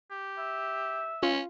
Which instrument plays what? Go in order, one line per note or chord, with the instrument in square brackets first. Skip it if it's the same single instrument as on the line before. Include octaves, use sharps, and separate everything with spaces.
[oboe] G4
[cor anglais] E5
[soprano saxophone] C#4 [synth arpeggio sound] F4